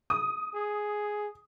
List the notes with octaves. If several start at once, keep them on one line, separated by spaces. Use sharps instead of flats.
D#6
G#4